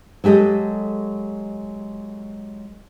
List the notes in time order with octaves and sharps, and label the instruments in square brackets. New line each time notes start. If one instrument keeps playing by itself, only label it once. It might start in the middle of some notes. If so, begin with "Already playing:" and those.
[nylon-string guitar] F#3 G#3 G4 A4 D#5